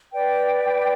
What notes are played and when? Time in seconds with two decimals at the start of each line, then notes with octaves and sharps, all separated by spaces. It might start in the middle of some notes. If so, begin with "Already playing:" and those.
0.13 B4 D5 G5